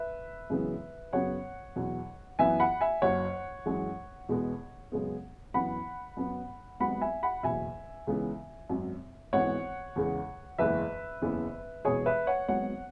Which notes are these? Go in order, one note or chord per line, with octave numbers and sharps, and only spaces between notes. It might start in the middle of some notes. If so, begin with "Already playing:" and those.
Already playing: B4 E5
F#2 C#3 E3 G#3 B3
F#2 C#3 F#3 B3 C#5 F#5
E2 B2 F#3
F#2 E3 B3 E5 G#5
F#5 B5
E5 G#5
F#1 F#2 F#3 C#5 F#5
F#2 E3 G#3
E2 B2 G#3 B3
F#2 C#3 G#3 B3
F#2 E3 B3 F#5 B5
F#2 F#3 B3
G#1 G#2 F#3 B3 F#5 B5
E5 G#5
F#5 B5
F#1 E2 B2 E5 G#5
C#2 C#3 E3 G#3 B3
G#1 F#2 F#3
G#1 G#2 E3 B3 C#5 F#5
E2 C#3 G#3
F#1 E2 E3 G#3 B4 E5
F#1 E2 C#3 E3 B3
E1 E2 B2 G#4 C#5
B4 E5
C#5 F#5
G#1 G#2 F#3 B3 C#5 F#5